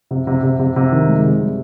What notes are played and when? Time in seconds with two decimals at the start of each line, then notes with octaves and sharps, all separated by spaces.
0.11 C3
0.27 C3
0.43 C3
0.59 C3
0.76 C3
0.92 D#3
1.09 G#3
1.25 C3
1.41 G3